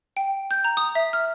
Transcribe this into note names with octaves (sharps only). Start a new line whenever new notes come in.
G5
G6
A#5
D#6
E5
F6